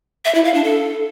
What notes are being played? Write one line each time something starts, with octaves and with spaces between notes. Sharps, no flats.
E5
E4
F5
D4
A4